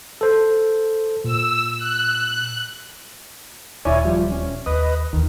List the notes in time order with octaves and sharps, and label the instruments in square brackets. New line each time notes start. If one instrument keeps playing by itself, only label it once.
[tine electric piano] A4 C5
[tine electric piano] A#2 [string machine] E6
[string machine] F#6
[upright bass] D#1 D#2 [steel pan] E4 D5 [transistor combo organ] C#5 G#5
[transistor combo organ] F3 G3
C#4
[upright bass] D#2 [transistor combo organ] B4 D#5 [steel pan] D#6
[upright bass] D#2 E3 [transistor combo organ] D#3